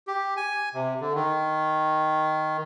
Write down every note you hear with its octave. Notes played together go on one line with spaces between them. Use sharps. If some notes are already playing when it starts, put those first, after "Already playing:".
G4
G#5
C3
D3
D#3